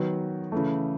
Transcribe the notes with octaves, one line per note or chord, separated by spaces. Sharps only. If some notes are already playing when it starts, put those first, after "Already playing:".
Already playing: D#3 F#3 B3
C#3 E3 A3